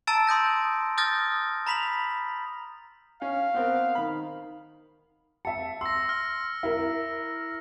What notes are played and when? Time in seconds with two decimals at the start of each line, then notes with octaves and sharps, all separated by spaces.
0.07 A5 A#5 E6 A6 D7
0.27 C6 D#6 G6 A#6
0.98 D#6 F6 G6 A6 A#6
1.66 A#5 B5 B6 F7 F#7
3.22 C#4 F5
3.54 B3 C4 A#4
3.95 D#3 B5
5.45 E5 A5 C#7
5.81 C6 E6 A#6
6.09 F6
6.63 E4 A#4